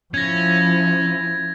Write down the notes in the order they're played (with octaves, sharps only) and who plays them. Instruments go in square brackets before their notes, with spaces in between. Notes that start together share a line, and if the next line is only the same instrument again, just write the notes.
[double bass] F3 E4 [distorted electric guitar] C#4 [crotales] G#6 A#6